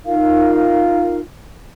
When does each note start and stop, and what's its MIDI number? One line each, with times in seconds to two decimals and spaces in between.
0.05 1.18 63
0.05 1.18 65
0.05 1.18 70
0.05 1.18 77